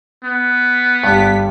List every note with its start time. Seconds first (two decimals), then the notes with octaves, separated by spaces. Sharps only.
0.24 B3
1.04 G1 G2 G3 B6